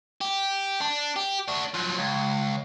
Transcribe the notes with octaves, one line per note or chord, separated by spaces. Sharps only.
G4
D4
G4
D4 F#4
F3 F#3
C#2